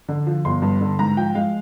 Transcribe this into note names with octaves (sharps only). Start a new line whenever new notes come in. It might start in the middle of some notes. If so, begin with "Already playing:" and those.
D3
F3
G1 C6
G2
D3
G#2 A#5
F3 G5
G#3 F5